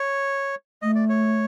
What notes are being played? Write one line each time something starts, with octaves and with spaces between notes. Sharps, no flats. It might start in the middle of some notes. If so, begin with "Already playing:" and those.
Already playing: C#5
A3 D#5
D5
C#5